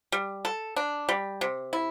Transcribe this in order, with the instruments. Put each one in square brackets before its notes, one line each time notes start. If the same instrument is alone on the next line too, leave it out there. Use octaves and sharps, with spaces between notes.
[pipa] G3
A4
D4
G3
C3
E4